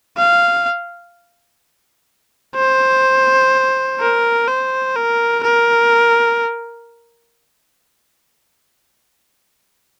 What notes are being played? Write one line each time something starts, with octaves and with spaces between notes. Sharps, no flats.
F5
C5
A#4
C5
A#4
A#4